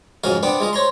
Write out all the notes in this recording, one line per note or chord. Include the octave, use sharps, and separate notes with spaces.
F2 G#2 C#4 F#4 A#4 F5
B3 C4 D4 B4
G#3 F4 D#5
C5 C#5 A#5 C6